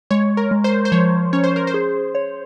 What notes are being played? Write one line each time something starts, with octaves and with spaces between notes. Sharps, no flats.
G#3 C#5
A#4
G#3
C5
C5
F3 C#5
C#4 C#5
C5
A#4
C5
G#4
C#5